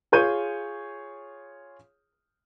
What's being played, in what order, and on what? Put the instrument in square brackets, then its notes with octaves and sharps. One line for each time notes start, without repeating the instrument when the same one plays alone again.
[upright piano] F4 G#4 C#5 G6 D#7